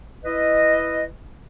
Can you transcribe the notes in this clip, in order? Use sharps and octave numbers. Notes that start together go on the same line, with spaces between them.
E4 B4 D#5